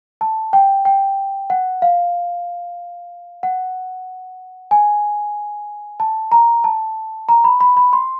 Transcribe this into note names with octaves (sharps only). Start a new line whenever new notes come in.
A5
G5
G5
F#5
F5
F#5
G#5
A5
A#5
A5
A#5
B5
B5
B5
C6